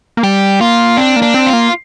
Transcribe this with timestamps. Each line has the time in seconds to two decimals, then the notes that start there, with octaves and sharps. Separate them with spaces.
0.17 A#3
0.23 G3 G4
0.61 A#3 F4
0.97 C4 D4
1.16 A#3
1.22 D4
1.34 C4
1.47 F4
1.53 A#3